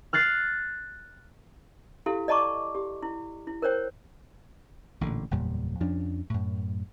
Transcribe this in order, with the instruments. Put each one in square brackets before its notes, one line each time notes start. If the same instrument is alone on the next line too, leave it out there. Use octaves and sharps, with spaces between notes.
[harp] F6 F#6 A6 C7
[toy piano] E4 G4 A4 F5
D5 D#5 A5 A#5 C#6 D6
G4
E4
E4
A#4 C5 C#5 G5
[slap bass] A1 A#2 D3
F#1 E2 A#2 G3
F2 F3 C#4 D4
F#2 A2